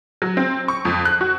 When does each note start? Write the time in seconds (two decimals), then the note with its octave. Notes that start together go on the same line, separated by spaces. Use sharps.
0.22 F#3
0.37 C4
0.68 C#6
0.85 F2
1.05 F#6
1.21 F#4